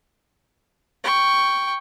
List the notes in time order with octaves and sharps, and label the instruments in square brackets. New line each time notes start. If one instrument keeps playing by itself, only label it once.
[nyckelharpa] G5 C#6